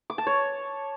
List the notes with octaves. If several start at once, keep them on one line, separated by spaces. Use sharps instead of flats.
D6
A5
C#5